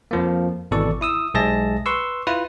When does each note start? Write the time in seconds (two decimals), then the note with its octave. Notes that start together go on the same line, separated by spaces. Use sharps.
0.11 F2 F3 A#3
0.71 G#1 B2 E3 A4 D5 C#6
1.01 E4 D#6 E6
1.34 B1 G#3 G#4 E5 A5 A#6
1.86 B4 C6 C#6 E6
2.27 E4 F4 B4